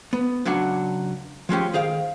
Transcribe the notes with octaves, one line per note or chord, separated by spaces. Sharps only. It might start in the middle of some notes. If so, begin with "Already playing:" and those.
B3
C#2 F#3 D4 F#5
F3 G#3 C#4 G4
D#3 G#4 C5 F5 G5